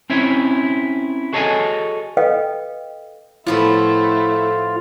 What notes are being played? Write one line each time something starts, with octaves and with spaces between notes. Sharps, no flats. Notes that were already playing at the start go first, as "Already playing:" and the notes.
C4 C#4 E4 C#5
F#4 G#4 A4 C#5 D#5 G#5
A4 B4 D#5 F5 G5
A2 F3 A3 B3 E4 F4